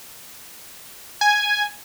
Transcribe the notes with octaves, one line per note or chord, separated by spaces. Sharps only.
G#5